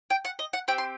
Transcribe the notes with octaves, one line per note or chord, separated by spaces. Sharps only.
G5
F#5
D#5
F#5
C4 G4 G5
C6